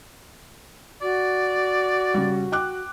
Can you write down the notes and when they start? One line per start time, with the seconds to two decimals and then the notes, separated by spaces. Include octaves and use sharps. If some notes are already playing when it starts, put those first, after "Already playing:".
1.02 F#4 D5
2.14 C#3 G3
2.52 G5 D6 F#6